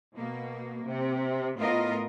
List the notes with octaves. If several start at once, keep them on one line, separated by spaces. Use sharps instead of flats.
B2 A#3
C3
A2 B3 F4 A#4 D#5